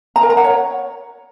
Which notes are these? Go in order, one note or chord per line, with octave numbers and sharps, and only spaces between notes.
A#5
A#4
A#5
F#5
C#5